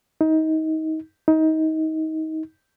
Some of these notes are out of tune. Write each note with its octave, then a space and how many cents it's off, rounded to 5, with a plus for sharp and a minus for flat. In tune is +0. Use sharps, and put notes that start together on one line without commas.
D#4 +25
D#4 +25